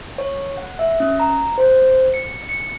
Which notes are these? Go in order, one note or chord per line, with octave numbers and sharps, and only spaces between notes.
C#5
F#5
E5
C#4
A#5
C5
C#7
C#7